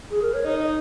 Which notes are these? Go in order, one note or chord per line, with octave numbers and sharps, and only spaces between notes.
G#4
A#4
C#5
D#4 D#5
D#5